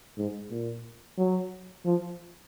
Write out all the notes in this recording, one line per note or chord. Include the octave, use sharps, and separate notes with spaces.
G#2
A#2
F#3
F3